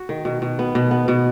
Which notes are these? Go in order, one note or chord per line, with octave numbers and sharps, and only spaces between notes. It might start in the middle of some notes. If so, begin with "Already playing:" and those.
Already playing: F#4
D#3
B2
B2
B3
B2
B3
B2